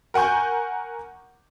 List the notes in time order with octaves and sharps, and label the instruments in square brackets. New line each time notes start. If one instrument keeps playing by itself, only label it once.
[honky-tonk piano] A#4 F#5 G#5 C#6 G6